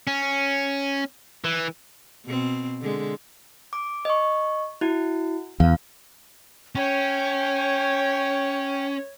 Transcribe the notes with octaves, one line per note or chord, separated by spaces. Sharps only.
C#4
E3
B2 C4
D3 G#3
D6
D#5 C#6
E4 F#4
E2 F5
C#4 C#5 G5